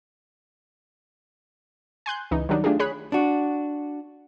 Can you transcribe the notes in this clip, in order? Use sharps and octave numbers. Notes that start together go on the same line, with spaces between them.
G#5 C6 F#6 G6
C#2 E3 D#4
D#3 F#3 G3 D4 D#4
A3 D4 F4 G4 G#4
G#4 C#5 B5 F#6
D4 F#4